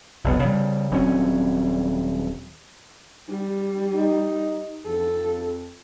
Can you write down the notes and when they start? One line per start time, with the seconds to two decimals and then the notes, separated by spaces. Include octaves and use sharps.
0.24 F1 B1 B3
0.44 C#3 G3
0.91 D#1 F#3 C4 C#4
3.29 G3
3.95 D#4
4.86 F2 A4